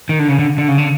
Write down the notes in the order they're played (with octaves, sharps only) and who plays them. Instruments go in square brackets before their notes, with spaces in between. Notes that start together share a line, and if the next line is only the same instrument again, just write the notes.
[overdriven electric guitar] D#3
D3
C#3
D3
D3
C#3
D3